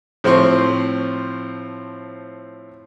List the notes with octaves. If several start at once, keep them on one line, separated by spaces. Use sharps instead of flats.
A2 F3 C4 C6 C#6